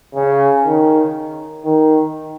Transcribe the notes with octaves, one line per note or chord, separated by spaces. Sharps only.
C#3
D#3
D#3